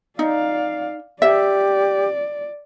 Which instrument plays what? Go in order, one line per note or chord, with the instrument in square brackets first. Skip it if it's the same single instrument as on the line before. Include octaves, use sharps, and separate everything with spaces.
[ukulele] D#4 [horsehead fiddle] D5 F5
[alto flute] G4 [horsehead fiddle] D5 [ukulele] E5